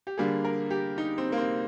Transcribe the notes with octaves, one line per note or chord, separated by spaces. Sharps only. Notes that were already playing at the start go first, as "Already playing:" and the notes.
G4
D3 G3 A#3 G#4
A#4
G4
D#4
C4
A#3
C4